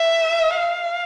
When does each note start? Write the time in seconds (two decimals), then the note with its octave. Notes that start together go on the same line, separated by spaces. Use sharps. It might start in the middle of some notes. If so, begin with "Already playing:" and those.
Already playing: E5
0.56 F5